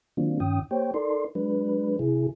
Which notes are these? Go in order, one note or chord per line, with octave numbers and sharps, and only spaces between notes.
D#3 F#3 A#3 C4 D4 F4
G2 D#3 C#4 G5 D#6
A#3 G4 C5 C#5 G5
D#4 A4 A#4 D5 C6
F#3 G#3 D4 B4
C3 E4 G#4